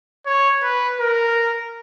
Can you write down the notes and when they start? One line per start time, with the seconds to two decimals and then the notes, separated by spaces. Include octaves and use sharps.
0.26 C#5
0.63 B4
1.00 A#4